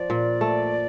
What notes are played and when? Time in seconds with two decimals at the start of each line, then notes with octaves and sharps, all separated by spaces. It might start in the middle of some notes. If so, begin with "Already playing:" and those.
Already playing: F3 D5
0.10 A#2
0.41 A3